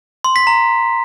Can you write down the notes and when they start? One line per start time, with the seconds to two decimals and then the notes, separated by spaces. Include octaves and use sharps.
0.24 C6
0.36 B6
0.47 A#5